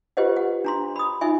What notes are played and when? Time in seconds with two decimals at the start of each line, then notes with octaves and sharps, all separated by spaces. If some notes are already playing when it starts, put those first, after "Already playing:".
0.17 F4 G4 B4 C5 D#5 F#5
0.36 F#5
0.64 D4 A#5 C6
0.96 B5 D#6
1.21 D#4 F4 E5 G#5